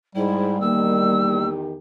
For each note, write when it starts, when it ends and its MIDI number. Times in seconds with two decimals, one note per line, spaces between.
0.15 0.57 44
0.15 1.52 55
0.15 0.57 64
0.60 1.75 40
0.60 1.75 51
0.60 1.49 58
0.60 1.75 67
0.60 1.46 88